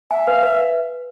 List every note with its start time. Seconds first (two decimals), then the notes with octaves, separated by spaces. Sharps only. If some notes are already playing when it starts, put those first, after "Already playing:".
0.11 E5 G#5
0.27 B4 F5
0.43 B4 E5